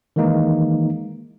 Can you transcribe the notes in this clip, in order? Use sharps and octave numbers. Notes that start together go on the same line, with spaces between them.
D#3 E3 G#3 A#3 D#4